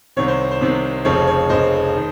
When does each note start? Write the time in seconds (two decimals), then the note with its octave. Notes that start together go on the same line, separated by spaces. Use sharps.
0.17 C2 C3 D#3 C#5
0.28 C5
0.51 C5
0.61 C2 C3 D#3
1.05 F1 F2 C#3 F3 C#5
1.27 C#5
1.49 F1 F2 C#3 F3 C5 D#5
1.96 D#3